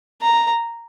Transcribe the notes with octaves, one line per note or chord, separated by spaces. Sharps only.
A#5